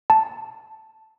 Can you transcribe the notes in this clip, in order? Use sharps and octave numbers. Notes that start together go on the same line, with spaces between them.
A5